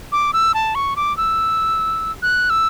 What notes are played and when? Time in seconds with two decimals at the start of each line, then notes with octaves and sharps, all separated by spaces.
0.12 D6
0.33 E6
0.54 A5
0.75 C#6
0.96 D6
1.17 E6
2.23 F#6
2.50 E6